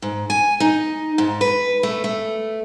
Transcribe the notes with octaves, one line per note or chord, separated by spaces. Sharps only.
G#2
G#5
D#4
G#2
B4
A3
A3